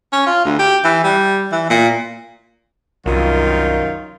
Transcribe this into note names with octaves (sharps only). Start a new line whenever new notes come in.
C#4
F4
D2
G4
E3
G3
E3
A#2
C2 F#2 D#3 F4